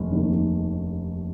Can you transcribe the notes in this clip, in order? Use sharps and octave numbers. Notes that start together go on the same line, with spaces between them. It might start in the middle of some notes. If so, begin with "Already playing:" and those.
Already playing: F1 D#2 D#3
F1 D#2 D#3